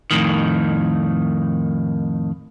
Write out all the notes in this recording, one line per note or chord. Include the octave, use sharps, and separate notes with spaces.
F2 A2 D#3